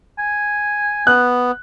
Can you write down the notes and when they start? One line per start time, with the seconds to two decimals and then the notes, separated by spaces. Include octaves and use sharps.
0.19 G#5
1.07 B3 F#6